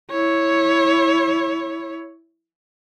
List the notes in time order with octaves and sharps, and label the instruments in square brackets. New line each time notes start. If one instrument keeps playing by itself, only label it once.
[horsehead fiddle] E4 C#5